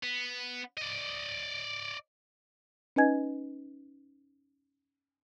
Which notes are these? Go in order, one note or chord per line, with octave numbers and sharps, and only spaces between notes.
B3
D5 D#5
C#4 D#4 B4 D#5 G#5 G#6